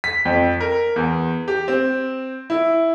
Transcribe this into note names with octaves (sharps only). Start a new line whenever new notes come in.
B6
F2
A#4
E2
G4
C4
E4